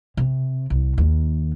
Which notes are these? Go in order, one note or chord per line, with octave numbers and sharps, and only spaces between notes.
C3
C2
D#2